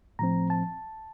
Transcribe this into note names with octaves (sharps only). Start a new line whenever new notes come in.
A2 F3 C4 A#5
A5